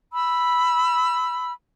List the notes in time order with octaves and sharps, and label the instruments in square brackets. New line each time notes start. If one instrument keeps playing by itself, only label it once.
[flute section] B5 E6